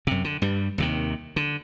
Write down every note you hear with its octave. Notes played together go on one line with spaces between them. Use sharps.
F#2 C3
D3
G2 G3
D#2 C3 D#3
D3